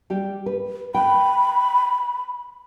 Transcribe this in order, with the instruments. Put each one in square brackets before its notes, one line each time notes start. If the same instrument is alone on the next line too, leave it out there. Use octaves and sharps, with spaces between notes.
[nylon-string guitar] G3 G4
B4
[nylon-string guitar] G5 [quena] B5